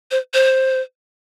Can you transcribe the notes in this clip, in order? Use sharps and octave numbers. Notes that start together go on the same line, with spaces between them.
C5
C5